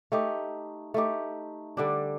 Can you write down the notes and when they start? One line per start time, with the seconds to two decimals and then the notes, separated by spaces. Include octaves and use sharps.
0.12 A3 D#4 G4
0.94 A3 D#4 G4
1.77 D3 G3 D4